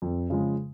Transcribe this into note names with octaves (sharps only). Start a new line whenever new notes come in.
F2
C#3 F3 G#3